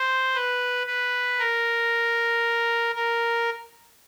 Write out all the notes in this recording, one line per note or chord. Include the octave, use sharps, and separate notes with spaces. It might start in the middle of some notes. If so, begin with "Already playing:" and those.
Already playing: C5
B4
B4
A#4
A#4